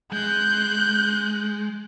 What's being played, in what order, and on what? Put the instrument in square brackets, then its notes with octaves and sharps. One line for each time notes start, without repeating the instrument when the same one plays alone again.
[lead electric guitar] G#3 [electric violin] F#6 G6